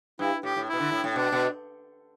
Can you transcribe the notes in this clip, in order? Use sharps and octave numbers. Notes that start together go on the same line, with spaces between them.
G2 E4
A2 G4
A2
B2 E4
D3
A2
A2
B2 D4
B2